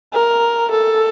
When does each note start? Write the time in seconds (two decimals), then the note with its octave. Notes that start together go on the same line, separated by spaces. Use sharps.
0.13 A#4
0.71 A4